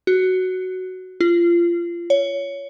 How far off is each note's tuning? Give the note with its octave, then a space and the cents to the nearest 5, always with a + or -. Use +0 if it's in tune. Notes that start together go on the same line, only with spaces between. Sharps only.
F#4 +5
F4 -25
C#5 +15